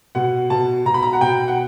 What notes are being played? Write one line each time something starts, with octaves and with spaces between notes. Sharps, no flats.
B2 F#5
B2 A5
B2 A#5
B5
A#5
F#5
B2 G5
F#5